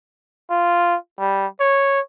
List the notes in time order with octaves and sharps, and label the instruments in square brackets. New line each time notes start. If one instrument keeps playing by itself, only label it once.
[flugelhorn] F4
G3
C#5